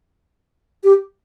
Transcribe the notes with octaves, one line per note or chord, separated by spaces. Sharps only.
G4